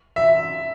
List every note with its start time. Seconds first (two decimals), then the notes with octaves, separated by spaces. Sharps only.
0.16 E5